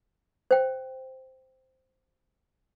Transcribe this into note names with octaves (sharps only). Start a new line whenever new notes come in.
C5 G5